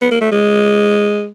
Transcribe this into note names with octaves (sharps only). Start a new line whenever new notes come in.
B3
A#3
A3
G#3